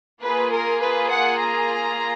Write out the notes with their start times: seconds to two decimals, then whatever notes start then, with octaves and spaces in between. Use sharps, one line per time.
0.22 A#3 F4 G#4 B4
0.51 A#4
0.80 B4
1.09 F#5
1.38 A#5